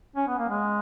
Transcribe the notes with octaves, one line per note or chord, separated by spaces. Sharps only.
C#4
B3
A#3
G#3